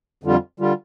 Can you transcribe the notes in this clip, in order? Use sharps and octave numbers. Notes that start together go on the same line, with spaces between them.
F2 D3 G3 F4
D3 G3 F4